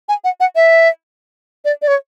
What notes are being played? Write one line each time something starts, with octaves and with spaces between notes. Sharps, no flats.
G#5
F#5
F#5
E5
D5
D5
C#5